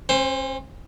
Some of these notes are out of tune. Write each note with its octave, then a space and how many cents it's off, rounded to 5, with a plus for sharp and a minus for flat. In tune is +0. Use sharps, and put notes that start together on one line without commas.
C#4 -45 C5 +0